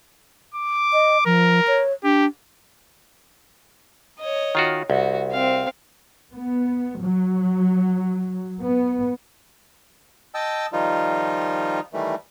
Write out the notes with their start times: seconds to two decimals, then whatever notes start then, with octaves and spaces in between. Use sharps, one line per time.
0.54 D6
0.93 D#5
1.26 F3 A#4
1.67 C#5
2.04 D4 G4
4.20 C#5 D#5
4.55 D#3 F4 F#4
4.90 C2 F#4
5.31 C4 F5
6.33 B3
7.00 F#3
8.62 B3
10.34 D#5 G5 A5 E6
10.73 D#3 F3 G3 D#4 F4
11.93 D#3 E3 G3 A3